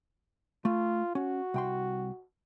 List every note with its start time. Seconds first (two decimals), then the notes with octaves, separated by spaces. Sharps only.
0.65 A3 F4
1.15 C#4 F#4
1.54 C2 G5 C6